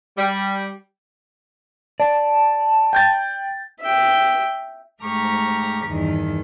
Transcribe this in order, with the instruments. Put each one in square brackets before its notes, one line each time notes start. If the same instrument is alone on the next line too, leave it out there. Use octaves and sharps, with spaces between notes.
[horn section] G3
[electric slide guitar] D5 [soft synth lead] A5
[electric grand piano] G5 G6 A6
[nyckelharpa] E5 G5
[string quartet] G#2 A3 G4 A#5 C#6 F6
E2 G2 D#3